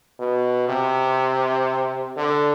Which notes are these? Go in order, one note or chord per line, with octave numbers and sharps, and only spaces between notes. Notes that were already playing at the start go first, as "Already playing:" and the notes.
B2
C3
D3